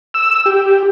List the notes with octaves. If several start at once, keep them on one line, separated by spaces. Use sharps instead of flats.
E6
G4